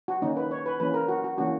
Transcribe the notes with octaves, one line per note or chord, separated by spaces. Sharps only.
F#4
D#3 A#3 C#4 D#4
B4
C#5
B4
E3 A#3 C#4 B4
A#4
F#4
F#4
E3 A#3 C#4 F#4